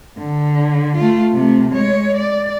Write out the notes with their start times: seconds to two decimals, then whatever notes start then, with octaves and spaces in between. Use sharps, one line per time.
0.19 D3
0.97 A3 F4
1.33 C3 A3
1.70 G#3 C#5
2.17 D5